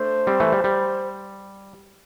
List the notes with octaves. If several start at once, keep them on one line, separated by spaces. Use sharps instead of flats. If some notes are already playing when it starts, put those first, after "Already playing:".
Already playing: A3 D4 C5
G3 C4
E3 A3
G3
G3